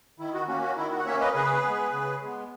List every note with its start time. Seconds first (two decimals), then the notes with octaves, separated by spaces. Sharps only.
0.19 D#3 E4
0.34 F#4
0.48 A#3 C#4 F#4
0.63 F#4
0.77 D#3 E4
0.91 F#4
0.99 F#5
1.06 A#3 C#4 C#5 E5
1.20 B4 D#5
1.35 C#3 G#4 B4
1.64 G#3 B3
1.93 C#3
2.21 G#3 B3